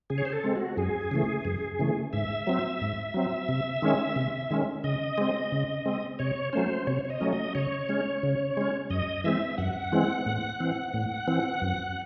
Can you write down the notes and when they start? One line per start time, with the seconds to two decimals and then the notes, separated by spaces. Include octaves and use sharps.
0.10 C#3 G#4
0.18 C#5
0.25 C5
0.33 A4
0.44 G#3 C4
0.56 F#4
0.77 F#2 G#4
1.11 C#3 E3 A3
1.45 F#2
1.79 C#3 E3 A3
2.13 G#2 E5
2.47 F#3 C4
2.81 G#2
3.14 F#3 C4
3.49 C3
3.82 D#3 G#3 C#4
4.16 C3
4.51 D#3 G#3 C#4
4.84 C#3 D#5
5.18 G#3 C4
5.52 C#3
5.86 G#3 C4
6.19 C3 C#5
6.53 F#3 A3 C#4 C5
6.87 C3 C#5
7.05 C#5
7.10 D#5
7.21 F#3 A3 C#4
7.33 D#5
7.55 C#3 C#5
7.89 G#3 C#4
8.23 C#3
8.57 G#3 C#4
8.90 F#2 D#5
9.24 E3 G#3 C4 E5
9.58 F#2 F#5
9.92 E3 G#3 C4
10.26 A2
10.60 E3 C4
10.94 A2
11.28 E3 C4
11.62 F#2